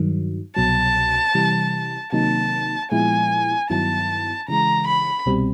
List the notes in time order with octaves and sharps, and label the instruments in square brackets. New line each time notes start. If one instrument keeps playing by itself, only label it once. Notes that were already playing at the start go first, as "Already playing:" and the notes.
Already playing: [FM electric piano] G2 D#3 F#3
[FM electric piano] C2 B2 F#3 [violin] A5
[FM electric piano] C3 E3 G3
[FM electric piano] C3 D#3 F#3 A#3 D#4 [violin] A5
[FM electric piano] A#2 F3 G#3 B3 E4 [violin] G#5
[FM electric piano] G2 D#3 F#3 B3 E4 [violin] A5
[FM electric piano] C#3 E3 G#3 [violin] A#5
[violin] B5
[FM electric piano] C2 B2 G3 C4